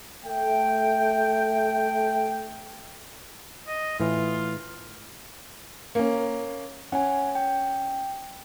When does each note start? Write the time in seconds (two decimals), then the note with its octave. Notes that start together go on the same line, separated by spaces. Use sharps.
0.25 A3 G5
3.67 D#5
4.00 A2 E3 F4
5.95 A#3 C#4
6.92 C#4 F#5 G#5
7.35 G5